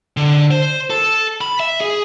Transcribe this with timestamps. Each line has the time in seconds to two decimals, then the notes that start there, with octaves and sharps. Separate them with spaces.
0.17 D3
0.51 C5
0.90 A4
1.41 B5
1.60 E5
1.81 G#4